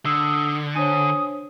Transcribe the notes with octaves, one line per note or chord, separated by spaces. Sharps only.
D3 D#6 E6
D4 C5 C#5 G#5 D#6